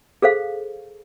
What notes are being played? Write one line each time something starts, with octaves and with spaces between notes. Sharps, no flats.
G#4 A4 C5 F5